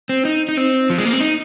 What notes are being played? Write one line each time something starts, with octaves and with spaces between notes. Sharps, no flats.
C4
D#4
D#4
C4
F3
G#3
A#3
C4
D#4